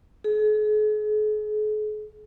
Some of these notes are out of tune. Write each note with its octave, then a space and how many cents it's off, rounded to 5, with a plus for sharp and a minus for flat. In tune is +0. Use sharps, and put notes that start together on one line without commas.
G#4 +40